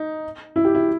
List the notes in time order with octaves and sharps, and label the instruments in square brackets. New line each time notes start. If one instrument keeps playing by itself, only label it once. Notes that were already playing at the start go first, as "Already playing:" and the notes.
Already playing: [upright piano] D#4
E4
G4
E4